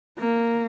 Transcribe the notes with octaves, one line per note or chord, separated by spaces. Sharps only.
A#3